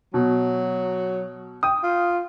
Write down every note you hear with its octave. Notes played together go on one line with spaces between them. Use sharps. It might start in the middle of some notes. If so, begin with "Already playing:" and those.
B2 F#3
G5 D#6
F4